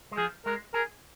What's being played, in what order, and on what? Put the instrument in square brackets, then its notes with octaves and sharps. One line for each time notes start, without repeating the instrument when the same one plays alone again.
[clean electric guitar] G#3
[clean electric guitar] F3 [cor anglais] G#4
[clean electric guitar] G#3 [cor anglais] A#4
[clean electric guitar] G#4 [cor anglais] A#4